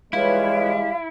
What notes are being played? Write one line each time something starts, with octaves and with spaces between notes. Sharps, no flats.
E3 G3 G#3 E4 F4 B4 C#5 F5